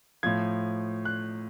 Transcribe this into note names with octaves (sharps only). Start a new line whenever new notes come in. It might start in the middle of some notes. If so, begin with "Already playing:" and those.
A2 F3 G#6
F#6